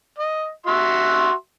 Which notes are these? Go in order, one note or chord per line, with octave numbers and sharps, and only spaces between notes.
D#5
F#4 E5 C6